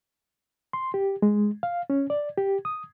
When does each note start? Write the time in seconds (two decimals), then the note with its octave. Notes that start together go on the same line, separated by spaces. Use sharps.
0.73 C6
0.94 G4
1.22 G#3
1.63 F5
1.90 C#4
2.10 D5
2.38 G4
2.65 D#6